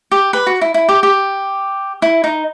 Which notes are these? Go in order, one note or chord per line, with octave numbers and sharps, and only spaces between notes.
G4
B4
F#4
E4
E4
G4
G4
E4
D#4